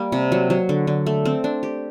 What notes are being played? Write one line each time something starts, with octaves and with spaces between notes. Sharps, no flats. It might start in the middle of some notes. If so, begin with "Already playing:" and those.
Already playing: G3 A#3
C3
F#3
F#3
D3
D3
A3
C4
D4
G4